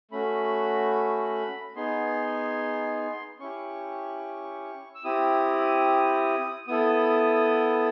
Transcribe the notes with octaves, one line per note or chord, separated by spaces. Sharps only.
A3 C#4 F#4 B5
B3 D#4 G#4 C6
C#4 E4 G4 C#6
E6
C4 E4 G4 D#6
B3 E4 A4 D#6